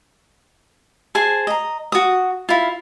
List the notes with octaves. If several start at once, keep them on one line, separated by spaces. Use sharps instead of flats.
G#4 C5 G#5 A5
D#5 A#5
F#4 D#6
E4 F4